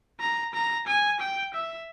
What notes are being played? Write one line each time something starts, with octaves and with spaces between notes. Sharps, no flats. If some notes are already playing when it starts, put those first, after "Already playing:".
A#5
A#5
G#5
G5
E5